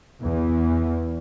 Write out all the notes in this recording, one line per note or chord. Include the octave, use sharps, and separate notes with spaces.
E2 E3